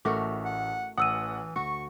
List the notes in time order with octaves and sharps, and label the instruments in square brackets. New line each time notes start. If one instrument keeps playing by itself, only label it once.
[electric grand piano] A1 [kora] A3 F#4 A#4 [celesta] D6
[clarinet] F#5
[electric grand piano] A1 F#5 [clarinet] E3 [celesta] D#6 E6 D#7
[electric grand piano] D2 [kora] F#4 [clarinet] C#6